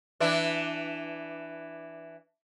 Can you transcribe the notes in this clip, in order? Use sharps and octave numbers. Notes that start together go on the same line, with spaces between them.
E3 D4 E4